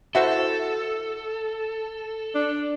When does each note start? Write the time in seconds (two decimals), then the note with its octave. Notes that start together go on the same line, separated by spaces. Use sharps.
0.15 E4 F#4 A4 C5
2.35 D4